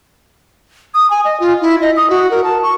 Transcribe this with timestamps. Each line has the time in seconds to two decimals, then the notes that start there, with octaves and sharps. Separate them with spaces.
0.94 D#6
1.10 G#5
1.25 D#5
1.40 F4
1.62 E4
1.81 D#5
1.97 D#6
2.10 F#4
2.31 A#4
2.44 A5
2.63 C#6